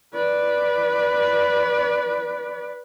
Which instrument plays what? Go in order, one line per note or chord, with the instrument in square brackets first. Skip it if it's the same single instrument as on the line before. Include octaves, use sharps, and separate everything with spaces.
[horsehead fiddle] B4 D5